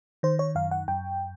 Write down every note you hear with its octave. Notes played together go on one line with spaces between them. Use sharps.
D#3 C5
C#5
F#2 F5
F#5
F#2 G5